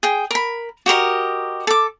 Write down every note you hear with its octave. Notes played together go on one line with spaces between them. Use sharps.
G#4 G5
A#4 B5
F#4 G4 A#4 D#5
A4 D6